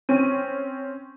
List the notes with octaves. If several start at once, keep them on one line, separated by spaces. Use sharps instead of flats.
C4 C#4 D#7